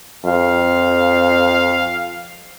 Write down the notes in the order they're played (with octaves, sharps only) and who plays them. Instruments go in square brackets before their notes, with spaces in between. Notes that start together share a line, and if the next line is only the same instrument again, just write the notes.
[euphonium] F2 [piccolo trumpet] F5